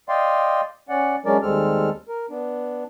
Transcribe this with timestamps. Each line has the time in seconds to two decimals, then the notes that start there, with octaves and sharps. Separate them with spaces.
0.09 D5 D#5 F5 G5 C6
0.89 C#4 D5 F#5
1.25 F#3 G#3 C#4 D4 A#4 D5
1.42 D#2 G3 G#3 C4 A4 F6
2.09 A#4
2.30 B3 D4